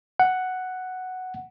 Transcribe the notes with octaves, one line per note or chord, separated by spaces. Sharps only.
F#5